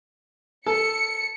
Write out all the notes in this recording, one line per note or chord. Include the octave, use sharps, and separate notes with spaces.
A4 C#7